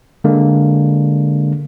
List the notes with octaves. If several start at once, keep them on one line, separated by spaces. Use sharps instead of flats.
D3 G#3 A#3 D4